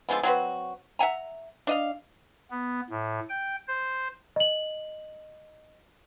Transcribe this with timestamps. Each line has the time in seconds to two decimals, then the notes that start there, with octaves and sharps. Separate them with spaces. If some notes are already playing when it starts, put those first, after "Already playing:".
0.09 D3 F3 G#3 B3
0.23 F#3 C4 F#4 B4
0.99 E5 F#5 G#5 A#5
1.67 D4 D#5 F5
2.51 B3
2.90 A2
3.29 G5
3.68 C5
4.36 D#5 F#7